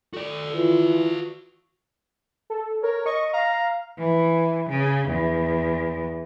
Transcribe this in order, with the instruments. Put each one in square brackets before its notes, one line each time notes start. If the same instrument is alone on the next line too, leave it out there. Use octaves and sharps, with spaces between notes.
[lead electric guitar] F#4 D5 [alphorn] A4
[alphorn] E3 [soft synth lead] F4
[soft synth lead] A4
[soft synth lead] A#4 [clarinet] C#5
[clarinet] D#5 [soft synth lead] C#6
[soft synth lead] F5 [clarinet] A#5
[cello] E3
C#3
E2